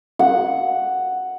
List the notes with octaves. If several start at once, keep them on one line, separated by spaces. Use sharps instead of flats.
F#5